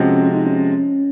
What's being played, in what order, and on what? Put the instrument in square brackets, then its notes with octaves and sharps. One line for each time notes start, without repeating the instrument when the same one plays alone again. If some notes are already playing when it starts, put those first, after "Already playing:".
Already playing: [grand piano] C3 F3 G#3 C4 F#4 [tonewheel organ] C#4
[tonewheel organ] D#4
C#4